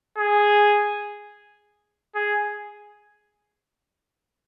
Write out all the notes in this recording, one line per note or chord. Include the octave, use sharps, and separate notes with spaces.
G#4
G#4